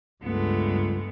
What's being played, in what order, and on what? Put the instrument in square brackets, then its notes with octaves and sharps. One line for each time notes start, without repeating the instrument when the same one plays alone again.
[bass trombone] C#2 [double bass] G2 [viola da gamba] G#3 A3 B3